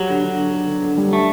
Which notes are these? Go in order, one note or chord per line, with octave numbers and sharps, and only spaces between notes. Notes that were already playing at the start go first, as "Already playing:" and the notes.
Already playing: F#3 G4
D3
D3
D3
D3
D3
D3
G3
A3 D4